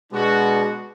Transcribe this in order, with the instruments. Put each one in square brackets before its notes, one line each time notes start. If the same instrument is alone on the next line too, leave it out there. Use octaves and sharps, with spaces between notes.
[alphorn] B2 [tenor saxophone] G#3 [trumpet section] D4 F#4